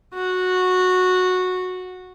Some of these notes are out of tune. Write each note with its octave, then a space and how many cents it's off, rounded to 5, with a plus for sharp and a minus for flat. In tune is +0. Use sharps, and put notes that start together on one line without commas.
F#4 -10